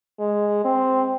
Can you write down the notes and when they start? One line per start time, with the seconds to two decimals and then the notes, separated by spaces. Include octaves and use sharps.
0.19 G#3
0.64 C4